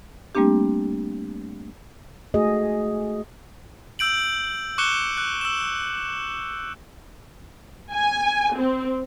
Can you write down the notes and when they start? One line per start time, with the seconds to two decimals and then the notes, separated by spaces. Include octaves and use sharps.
0.35 G3 A3 A#3 C4 D4 G4
2.34 A3 F#4 G#4 D#5
3.99 E6 G6 D7 F#7
4.78 C#6 D6 F#6 C#7 E7 G7
5.17 F#6
5.41 E6 E7
7.93 G#5
8.58 C4